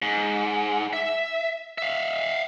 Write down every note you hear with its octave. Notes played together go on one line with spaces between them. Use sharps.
G#2
E5
E5 F5